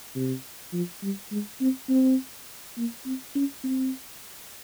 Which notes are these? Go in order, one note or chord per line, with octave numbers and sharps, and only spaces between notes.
C3
F3
G3
G#3
C4
C4
A#3
C4
C#4
C4